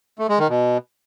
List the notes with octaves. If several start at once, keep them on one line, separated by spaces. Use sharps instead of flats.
A3
G#3
D#3
B2